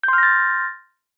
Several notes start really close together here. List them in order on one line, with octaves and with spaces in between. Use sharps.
G6 C6 F6 A#6 A6